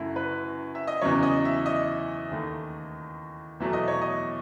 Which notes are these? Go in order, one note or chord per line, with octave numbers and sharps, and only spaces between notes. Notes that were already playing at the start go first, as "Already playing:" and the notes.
Already playing: F#2 C#3 F#3 A3 E4 F#4
B4
E5
D#5
E2 C#3 F#3 C#5
D#5
E5
D#5
D#2 D#3 A3
E2 B2 F#3 A3 E5
D#5
C#5
D#5